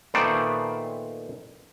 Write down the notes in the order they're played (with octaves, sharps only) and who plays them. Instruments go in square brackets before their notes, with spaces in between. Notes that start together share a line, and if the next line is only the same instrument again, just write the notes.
[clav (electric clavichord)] A#2 D#3 A3 B3 C5 D5